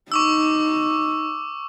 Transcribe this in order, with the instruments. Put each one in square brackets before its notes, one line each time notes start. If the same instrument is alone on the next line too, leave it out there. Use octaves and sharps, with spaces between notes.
[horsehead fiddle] D#4 [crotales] C#6 D6 E6